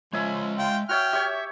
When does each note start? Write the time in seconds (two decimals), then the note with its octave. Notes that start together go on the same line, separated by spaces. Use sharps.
0.13 F3 G#3 C#5 D#5 E5 G#5
0.59 F4 G5
0.89 F#4 C#5 E5 G5 F6
1.13 G4 C#5 E5